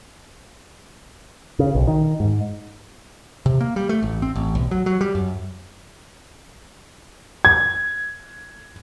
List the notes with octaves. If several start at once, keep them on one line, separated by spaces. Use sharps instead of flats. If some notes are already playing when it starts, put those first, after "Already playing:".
C#3
B1
D#3
G#2
C3
A#3
G3
A3
A1
C4
A1
B1
F#3
F#3
G3
F#2
G#6